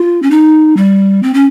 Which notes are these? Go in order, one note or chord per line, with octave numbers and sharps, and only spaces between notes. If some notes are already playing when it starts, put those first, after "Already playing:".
Already playing: F4
C#4
D#4
G3
C4
C#4